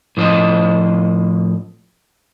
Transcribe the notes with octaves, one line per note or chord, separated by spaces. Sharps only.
A2 F3 C5 D#5